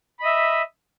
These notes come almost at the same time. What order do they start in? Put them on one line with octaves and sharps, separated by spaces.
B5 D#5 E5